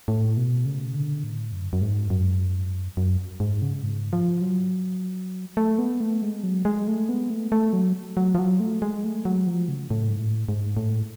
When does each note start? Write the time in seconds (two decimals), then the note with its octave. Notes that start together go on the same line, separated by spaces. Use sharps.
0.08 A2
0.37 B2
0.66 C#3
0.95 D3
1.23 A2
1.52 F#2
1.73 F#2
1.81 G#2
2.10 F#2
2.97 F#2
3.40 G#2
3.62 C#3
3.84 G#2
4.13 F3
4.42 F#3
5.57 A3
5.79 B3
6.00 A3
6.22 G#3
6.43 F#3
6.65 G#3
6.88 A3
7.09 B3
7.30 A3
7.52 A3
7.73 F#3
8.17 F#3
8.35 F3
8.39 F#3
8.60 A3
8.82 G#3
9.04 A3
9.25 F#3
9.47 F3
9.69 C#3
9.90 A2
10.09 G#2
10.19 A2
10.49 G#2
10.77 A2